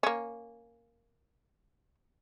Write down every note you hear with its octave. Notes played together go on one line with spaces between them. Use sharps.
A#3 C#4